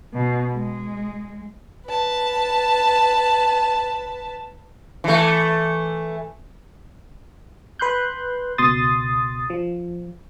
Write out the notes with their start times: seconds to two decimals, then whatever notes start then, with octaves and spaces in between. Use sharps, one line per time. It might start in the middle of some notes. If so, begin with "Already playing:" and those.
0.14 B2
0.53 G#3
1.87 B4 A5
5.04 E3 A3
7.79 B4 C6 F#6 G6
8.58 C#2 B2 C6 D#6 A6
9.50 F3